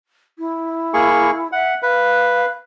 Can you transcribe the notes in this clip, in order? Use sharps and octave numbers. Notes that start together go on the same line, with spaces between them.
E4
A#3 G#4 C#6
E5 F#5
B4 F5